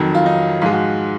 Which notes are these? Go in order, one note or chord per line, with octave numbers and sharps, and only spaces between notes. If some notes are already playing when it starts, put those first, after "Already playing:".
Already playing: F2 D#3 F#3
F4
D#4
G#2 F3 G#3 F4
F#4